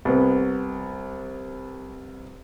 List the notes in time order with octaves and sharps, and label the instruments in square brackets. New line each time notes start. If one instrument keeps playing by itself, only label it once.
[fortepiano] C2 B3